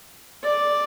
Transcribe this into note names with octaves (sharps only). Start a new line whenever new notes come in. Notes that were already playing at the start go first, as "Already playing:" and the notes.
D5